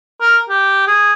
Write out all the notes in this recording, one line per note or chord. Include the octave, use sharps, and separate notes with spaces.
A#4
G4
G#4